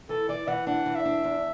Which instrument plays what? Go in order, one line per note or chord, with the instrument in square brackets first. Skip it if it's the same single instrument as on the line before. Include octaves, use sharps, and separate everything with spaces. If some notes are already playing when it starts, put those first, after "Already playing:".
[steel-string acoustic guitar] E3 [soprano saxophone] A4
[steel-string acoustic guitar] E3 [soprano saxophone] D5
[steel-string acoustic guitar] E3 [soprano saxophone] F#5
[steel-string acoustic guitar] D4 [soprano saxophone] F#5
[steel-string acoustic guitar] E3
[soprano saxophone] E5
[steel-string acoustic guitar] D4
E2